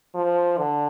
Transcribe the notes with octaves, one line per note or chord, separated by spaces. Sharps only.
F3
D3